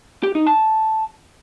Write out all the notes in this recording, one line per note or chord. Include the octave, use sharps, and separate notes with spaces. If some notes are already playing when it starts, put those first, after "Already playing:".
G4
D#4
A5